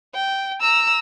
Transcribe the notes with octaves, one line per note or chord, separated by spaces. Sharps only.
G5
A#5 E6